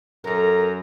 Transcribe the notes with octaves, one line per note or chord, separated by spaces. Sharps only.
F#2 A4 A#4 A#5